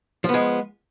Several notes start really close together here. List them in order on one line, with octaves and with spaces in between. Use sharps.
F3 B3 G#3